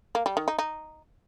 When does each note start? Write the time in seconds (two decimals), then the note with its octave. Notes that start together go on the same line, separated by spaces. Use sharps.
0.15 A#3
0.26 G3
0.37 D#3
0.48 D#4
0.59 D#4